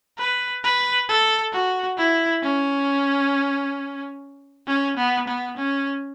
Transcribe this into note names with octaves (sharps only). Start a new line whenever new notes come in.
B4
B4
A4
F#4
E4
C#4
C#4
B3
B3
C#4